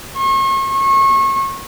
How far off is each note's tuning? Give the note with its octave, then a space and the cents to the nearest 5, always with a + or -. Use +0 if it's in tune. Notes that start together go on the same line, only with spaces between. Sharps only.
C#6 -40
C#6 -30